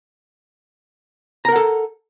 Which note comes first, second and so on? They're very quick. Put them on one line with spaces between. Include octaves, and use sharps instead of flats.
A#5 A#4 F#5 A4